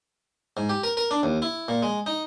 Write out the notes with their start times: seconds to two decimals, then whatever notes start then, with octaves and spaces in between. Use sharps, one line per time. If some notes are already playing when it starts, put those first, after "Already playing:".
0.57 G#2
0.69 G4
0.83 A#4
0.97 A#4
1.11 D4
1.23 D#2
1.42 E4
1.68 A#2
1.83 G#3
2.06 D#4